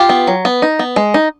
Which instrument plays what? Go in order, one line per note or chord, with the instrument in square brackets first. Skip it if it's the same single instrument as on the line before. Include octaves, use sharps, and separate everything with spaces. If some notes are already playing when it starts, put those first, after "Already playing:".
Already playing: [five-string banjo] F4 G4
B3
F#3
B3
D#4
B3
G#3
D#4